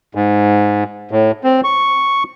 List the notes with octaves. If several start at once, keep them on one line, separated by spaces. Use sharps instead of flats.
G#2
A2
C4
C#6